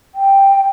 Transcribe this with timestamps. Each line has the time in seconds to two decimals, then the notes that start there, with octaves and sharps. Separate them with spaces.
0.15 G5